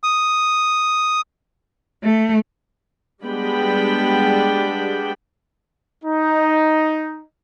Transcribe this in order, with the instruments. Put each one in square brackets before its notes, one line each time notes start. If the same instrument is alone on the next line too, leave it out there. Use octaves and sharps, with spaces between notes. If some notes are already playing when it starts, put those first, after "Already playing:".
[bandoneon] D#6
[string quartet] A3
[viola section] G3 G#3 B3 D4 G5 B5
[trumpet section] D#4